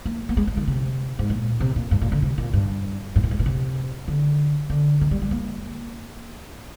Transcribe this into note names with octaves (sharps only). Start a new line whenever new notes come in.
A#3
A#3
G#3
F3
D#3
C3
G#2
A#2
C3
A#2
G2
A#2
D3
C3
A#2
G2
G2
A#2
G#2
A#2
C3
D3
D3
D#3
G3
G3
A#3